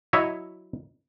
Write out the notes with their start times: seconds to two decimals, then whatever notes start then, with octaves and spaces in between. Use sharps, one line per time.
0.13 F#3 E4 C#5 D#5 E5